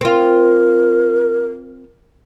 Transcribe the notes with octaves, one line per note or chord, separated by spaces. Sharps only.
C4 F4 A#4